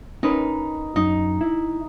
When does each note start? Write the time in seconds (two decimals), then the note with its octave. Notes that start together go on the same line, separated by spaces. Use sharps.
0.23 C#4 D#4 A#4 B4
0.96 F#2 D#4
1.41 E4